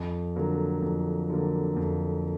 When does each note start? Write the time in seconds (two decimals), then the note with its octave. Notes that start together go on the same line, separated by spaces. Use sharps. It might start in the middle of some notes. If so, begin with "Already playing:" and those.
Already playing: F2
0.36 D3 F#3 A#3
0.82 F2
1.30 D3 F#3 A#3
1.77 F2